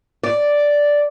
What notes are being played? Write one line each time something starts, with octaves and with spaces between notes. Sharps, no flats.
D5